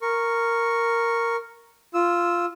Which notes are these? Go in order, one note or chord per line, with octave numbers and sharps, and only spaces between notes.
A#4 C#6
F4 E6